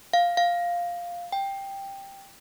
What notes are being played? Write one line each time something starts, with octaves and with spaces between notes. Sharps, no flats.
F5
F5
G5